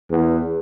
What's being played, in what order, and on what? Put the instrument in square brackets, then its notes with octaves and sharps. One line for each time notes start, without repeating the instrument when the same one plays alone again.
[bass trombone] E2